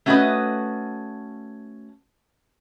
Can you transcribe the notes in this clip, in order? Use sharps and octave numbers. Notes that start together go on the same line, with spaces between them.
A3 C#4 F#4 G#4 B4 D#5